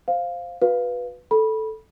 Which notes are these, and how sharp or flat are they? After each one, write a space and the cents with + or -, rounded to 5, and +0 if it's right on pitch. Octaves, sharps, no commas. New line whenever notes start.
C5 +0 F5 +0
F#4 -15 B4 +0 F5 +0
A4 +0 B5 -20